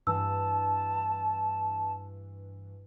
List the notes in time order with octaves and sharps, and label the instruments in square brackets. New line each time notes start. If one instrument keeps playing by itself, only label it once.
[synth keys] G2 E3 [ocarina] A5 [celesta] E6